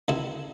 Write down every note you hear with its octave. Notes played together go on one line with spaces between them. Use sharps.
C#2 E4